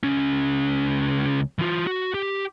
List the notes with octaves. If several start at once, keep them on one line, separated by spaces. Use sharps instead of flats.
C#2 C#4
E3 F4
F#4
G4